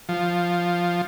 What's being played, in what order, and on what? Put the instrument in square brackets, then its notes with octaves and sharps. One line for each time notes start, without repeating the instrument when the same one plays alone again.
[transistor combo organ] F3